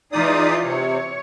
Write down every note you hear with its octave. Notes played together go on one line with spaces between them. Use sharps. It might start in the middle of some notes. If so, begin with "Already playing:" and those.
E3 D#4 F4 G#4 D5 D#6
C3 C#5